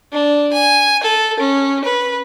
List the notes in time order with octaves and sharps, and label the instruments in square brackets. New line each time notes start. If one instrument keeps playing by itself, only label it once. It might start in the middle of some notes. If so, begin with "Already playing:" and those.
[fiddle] D4
G#5
A4
C#4
B4